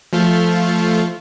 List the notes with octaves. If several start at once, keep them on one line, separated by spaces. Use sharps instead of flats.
F3 A3 F4